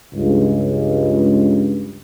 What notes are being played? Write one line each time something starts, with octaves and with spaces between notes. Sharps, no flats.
C#2 G2